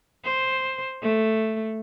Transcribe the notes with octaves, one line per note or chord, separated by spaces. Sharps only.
C5
A3